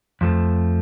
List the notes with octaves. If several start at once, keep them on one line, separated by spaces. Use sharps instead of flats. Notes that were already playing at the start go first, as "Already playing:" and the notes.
F2 F3 A3